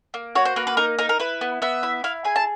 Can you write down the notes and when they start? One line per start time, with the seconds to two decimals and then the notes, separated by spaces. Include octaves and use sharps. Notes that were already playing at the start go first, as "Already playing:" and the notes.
0.14 A#3
0.35 F#4 C#5
0.45 C5
0.56 A#3 B4
0.67 B4
0.77 D#4 A#4
0.99 D#4 A#4
1.09 A#4
1.20 E4 B4
1.41 B3
1.62 B3 E5
1.83 E4
2.04 E4 F5
2.24 G#4 G#5
2.36 A5